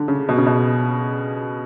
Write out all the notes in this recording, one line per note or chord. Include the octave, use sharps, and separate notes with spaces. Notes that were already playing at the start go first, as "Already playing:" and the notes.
Already playing: D3
C#3
B2
C#3
B2